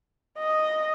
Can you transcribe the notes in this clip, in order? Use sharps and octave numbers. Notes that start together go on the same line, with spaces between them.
D#5